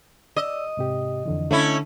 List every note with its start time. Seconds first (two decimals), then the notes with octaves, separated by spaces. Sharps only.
0.37 D5 D#5 E6
0.77 G#2 C3 G4
1.26 F2 D3 E3
1.51 D3 A3 C#4 D4 E4